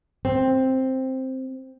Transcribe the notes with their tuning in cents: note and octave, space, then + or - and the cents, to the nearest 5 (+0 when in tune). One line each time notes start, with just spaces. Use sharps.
C4 +5